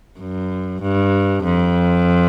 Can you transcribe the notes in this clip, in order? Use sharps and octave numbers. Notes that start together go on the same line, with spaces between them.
F#2
G2
F2